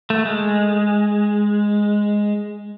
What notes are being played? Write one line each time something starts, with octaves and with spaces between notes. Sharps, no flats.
A3
G#3